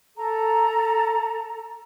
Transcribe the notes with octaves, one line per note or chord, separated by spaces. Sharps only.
A4 A#5